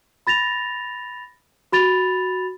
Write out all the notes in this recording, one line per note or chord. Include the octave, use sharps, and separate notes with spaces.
B5 A6 A#6 F7
F#4 B5 A6 F7